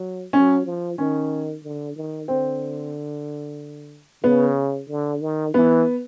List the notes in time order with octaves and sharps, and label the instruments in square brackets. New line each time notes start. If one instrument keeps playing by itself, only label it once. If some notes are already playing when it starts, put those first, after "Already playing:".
Already playing: [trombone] F#3
[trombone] F#3 [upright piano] C#4
[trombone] F3
[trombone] D#3 [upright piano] C#4
[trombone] D3
D#3
[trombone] D3 [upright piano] C4
[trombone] C#3 [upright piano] B3
[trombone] D3
D#3
[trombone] E3 [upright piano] B3